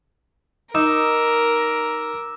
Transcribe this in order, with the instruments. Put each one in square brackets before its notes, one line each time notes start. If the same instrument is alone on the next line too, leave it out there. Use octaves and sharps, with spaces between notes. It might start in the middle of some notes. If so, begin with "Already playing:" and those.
[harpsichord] D#4 [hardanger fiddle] A#4 [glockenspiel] D6 E6 E7